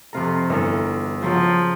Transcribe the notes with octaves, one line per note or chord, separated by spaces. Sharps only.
F2 C3 F4 A4 A#5
G1 E3 A4 A#4
C#3 F3 F#3